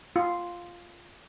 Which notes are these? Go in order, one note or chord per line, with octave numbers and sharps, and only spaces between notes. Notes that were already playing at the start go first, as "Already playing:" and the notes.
F4